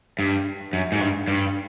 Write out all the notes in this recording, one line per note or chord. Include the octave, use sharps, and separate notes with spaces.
G2
F#2
G#2
G2
G2